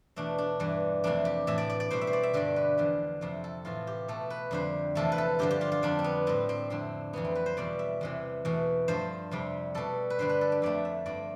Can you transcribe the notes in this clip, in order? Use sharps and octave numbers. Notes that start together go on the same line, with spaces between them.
E2 B2 A3 D4
D4
G2 E3 G3
F2 C3 E3 A3 D4
G4
A2 E3 A3 E5
D5
D5
D5
B2 G3 C5
E5
C5
D5
E5
G2 D3 G3 D5
B4
E2 D3 F3
F2 C3 F3 A3
A4
A2 E3 A3 F4
G4
B2 A3 A4
B4
F2 D3 G3 C5
E2 C3 F3 A3 A4
B4
A4
G2 D3 F3 G4
G4
F4
F4
F2 D3 G3 D4
C4
B3
A2 G3 C4
C4
F2 D3 A3 C4
F2 E3 G3 B3
C4
B4
C5
E2 B2 G3 D5
E5
E2 C3 E3
E2 B2 A3
G2 F3 A3 C5
F2 C3 G3
B2 G3 A4
B4
G2 D3 G3 C5
B4
A4
G4
F2 D3 F3 A3 D5
E5
G2 F3 A3 D5